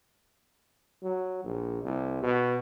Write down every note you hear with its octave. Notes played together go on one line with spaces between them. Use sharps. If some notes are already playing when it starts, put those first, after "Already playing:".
F#3
A#1
C2
B2